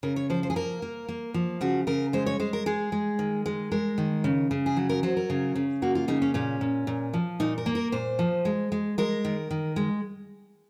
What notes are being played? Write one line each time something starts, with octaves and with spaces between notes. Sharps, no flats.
C#3 A#4
C#5
F3 C5
C5
G#4
A#3 A#4
A#3
A#3
F3
C#3 F#4
C#3 A#4
G#3 C5
C#5
G#3 C5
A#4
G#3 G#4
G#3
D#3
G#3
G#3 A#4
D#3
C#3
C#3
G#4
F#3 F#4
A#4
F#3 C5
A#4
C#3
C#3
A#3 F#4
F4
C#3 D#4
C#4
A#2 C#4
A#2
A#2
F3
A#2 D#4
A#4
A#3
A#4
A#2 C5
F3
G#3
G#3
G#3 A#4
D#3
D#3
G#3